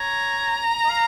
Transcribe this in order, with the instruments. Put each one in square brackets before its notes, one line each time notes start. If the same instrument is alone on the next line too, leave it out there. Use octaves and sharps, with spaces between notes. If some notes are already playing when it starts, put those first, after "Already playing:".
Already playing: [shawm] C#5 [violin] A#5
[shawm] D#5
F5